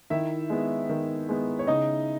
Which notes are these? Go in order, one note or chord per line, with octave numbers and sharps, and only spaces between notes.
D#3 E4 E5
G#3 B3
D#3
G#3 B3
C#5
C#3 D#4 D#5